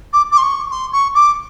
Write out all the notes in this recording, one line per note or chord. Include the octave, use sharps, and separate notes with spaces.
D6
D6
C6
C#6
C6
C#6
D6